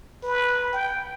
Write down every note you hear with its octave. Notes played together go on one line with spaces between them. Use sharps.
B4
G5